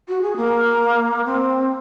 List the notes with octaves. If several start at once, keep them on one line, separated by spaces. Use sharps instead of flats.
F#4
G#4
A#3
C4